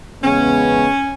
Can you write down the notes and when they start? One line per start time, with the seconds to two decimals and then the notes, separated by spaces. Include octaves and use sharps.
0.22 E2 C#3 G#3 B3 C#4